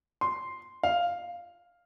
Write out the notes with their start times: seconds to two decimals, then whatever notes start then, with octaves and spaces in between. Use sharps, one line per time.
0.21 C6
0.83 F5